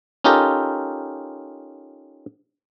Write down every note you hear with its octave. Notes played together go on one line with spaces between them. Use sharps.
C#4 D#4 F4 G4 A4 A#4